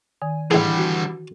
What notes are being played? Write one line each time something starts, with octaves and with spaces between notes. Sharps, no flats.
D#3 G#5
A1 D3 E3 G3 G#4
F#4